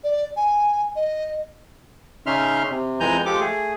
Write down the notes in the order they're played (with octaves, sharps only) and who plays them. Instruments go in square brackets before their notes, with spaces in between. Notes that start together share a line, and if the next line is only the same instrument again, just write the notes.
[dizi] D5
G#5
D#5
[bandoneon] C#3 C#4 D#4 E5 C6 F6
C3
F2 E3 G#3 G#5 A#5 G6
F3 G#3 G4 A4 D6
A3 G#4